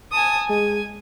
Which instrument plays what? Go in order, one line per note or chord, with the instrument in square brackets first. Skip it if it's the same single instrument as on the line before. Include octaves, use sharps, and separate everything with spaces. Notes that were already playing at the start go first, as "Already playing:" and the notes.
[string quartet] G#5 A5 D#6
[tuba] G#3 [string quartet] G#5